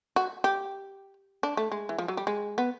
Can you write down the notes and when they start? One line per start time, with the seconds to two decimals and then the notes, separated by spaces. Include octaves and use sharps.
0.16 F#4
0.44 G4
1.43 D4
1.57 A3
1.72 G#3
1.89 E3
1.98 F3
2.08 F#3
2.17 G3
2.27 G#3
2.58 B3